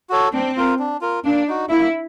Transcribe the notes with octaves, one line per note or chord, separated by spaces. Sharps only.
F#4 A4 C#5
C4 D4
F4 A#4
D4
F4 A#4
A#3 D4
D#4 F#4
A#3 E4